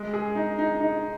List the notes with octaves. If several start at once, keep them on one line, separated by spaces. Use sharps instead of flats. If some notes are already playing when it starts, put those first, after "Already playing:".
Already playing: G#3
G#4
D#4
D#4
D#4